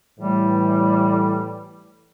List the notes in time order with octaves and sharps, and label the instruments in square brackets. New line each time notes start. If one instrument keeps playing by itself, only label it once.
[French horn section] A2 E3 [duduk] G3